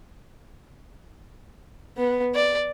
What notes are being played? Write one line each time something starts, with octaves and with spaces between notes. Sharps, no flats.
B3
D5